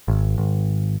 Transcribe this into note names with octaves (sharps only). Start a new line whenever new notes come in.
G#1
G#1